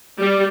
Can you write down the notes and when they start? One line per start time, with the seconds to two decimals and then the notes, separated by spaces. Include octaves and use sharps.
0.19 G3